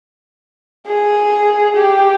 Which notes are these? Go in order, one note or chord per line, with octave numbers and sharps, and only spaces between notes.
G#4
G4